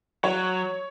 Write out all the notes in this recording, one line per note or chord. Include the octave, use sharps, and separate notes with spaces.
F#3 C#5